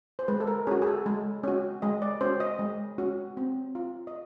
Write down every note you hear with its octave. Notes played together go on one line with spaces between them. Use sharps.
C5
G#3 B4
A4
A#4
C#4 F#4 G#4
G#4
A4
G#3
C#4 F#4
G#3 D#5
D5
C#4 F#4 C5
D#5
G#3
C#4 F#4
C4
F4
D#5